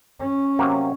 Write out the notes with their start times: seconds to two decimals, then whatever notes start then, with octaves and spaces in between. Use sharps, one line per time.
0.20 C#4
0.59 C3 F#3 A#3